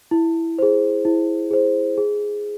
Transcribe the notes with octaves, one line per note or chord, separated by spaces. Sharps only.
E4
G#4 C5
E4
G#4 C5
G#4